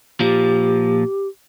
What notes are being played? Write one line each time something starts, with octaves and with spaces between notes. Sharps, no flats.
A#2 F3 G4